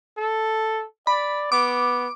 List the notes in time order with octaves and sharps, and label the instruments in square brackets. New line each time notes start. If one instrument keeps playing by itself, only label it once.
[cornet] A4
[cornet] D5 [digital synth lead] B5
[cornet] B3 [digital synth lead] D6